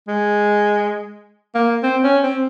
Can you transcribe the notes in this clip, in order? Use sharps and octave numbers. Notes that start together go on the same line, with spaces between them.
G#3
A#3
C4
C#4
C4